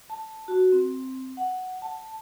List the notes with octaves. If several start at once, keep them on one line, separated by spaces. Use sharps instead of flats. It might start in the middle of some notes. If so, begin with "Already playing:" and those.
A5
F#4
C4
F#5
A5